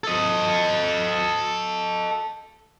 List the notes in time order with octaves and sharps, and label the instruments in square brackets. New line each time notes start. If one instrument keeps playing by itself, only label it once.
[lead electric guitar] A4 D#5